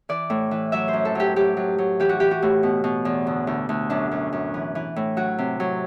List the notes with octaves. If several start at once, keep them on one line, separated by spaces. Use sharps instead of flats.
E3 D5
A2
E3
F#3 E5
C5
F#2
A4
F#3 G4
F#3 G4
F#3
F#3
E3 G4
F#4
E3 G4
F#4
A2
B2
B2
E2
D2
D2
D2
F#2 D4
F#2
F#2
E3
E3
A2
F#3 F#4
C3
F#3